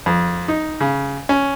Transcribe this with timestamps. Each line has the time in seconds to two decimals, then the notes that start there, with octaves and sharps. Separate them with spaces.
0.06 F2
0.48 D#4
0.81 C#3
1.29 C#4